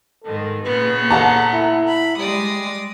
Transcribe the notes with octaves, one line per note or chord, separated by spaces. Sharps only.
G#2 D#3 A4
A#2 C#3 B3 B4
A4 F#5 A5 A#5
E4
B5
G3 G#3 D5 D#6